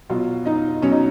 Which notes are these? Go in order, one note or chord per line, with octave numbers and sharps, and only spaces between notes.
B2 F#3 F4 F5
D#4 D#5
B2 F#3 C#4 C#5
D#4 D#5